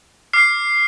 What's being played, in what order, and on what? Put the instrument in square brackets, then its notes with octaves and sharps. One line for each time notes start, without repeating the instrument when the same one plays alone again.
[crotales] D6 F6 C7